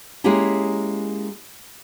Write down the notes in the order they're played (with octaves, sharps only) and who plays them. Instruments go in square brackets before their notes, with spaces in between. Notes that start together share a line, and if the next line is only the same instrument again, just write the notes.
[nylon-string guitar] G#3 A#3 C#4 E4 G4 G#4